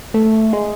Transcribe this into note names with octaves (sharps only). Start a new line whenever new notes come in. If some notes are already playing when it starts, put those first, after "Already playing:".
A3
G#3